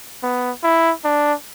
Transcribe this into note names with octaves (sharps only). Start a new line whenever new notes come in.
B3
E4
D4